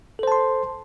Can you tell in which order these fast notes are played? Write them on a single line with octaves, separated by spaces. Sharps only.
A4 C5 A5 C6